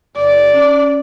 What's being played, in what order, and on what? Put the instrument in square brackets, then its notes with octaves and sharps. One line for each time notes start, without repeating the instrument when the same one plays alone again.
[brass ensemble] F#1 [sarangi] D5
[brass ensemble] C#4